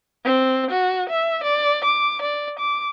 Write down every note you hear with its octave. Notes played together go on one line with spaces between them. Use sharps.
C4
F#4
E5
D5
D6
D5
D6